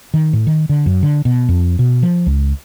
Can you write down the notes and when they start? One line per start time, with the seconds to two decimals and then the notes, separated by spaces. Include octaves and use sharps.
0.14 D#3
0.33 A2
0.47 D#3
0.69 D3
0.86 F#2
1.03 D3
1.25 B2
1.49 F2
1.79 B2
2.03 F3
2.26 C#2